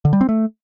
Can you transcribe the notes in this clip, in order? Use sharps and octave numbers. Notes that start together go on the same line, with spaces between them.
D3
G3
C4
A3